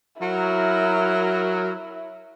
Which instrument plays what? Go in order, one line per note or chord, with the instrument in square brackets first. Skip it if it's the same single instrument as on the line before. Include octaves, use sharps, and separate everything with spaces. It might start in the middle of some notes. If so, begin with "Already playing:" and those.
[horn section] F#3 A#4 [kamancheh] E4